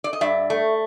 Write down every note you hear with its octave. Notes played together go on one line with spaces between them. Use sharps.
D5
D#5
G2 D5 E5
A3